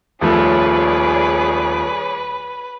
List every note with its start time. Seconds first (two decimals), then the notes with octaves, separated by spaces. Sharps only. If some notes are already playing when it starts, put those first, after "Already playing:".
0.21 D#1 F3 A3 G#4 B4 C#5 D5